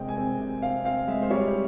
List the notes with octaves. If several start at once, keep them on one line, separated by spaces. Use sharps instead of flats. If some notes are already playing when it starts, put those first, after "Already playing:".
Already playing: C3 G#3 C4 G5
G#5
C4
C3
C4 F5
C4 F5
G#3 E5
C5
G3 C#5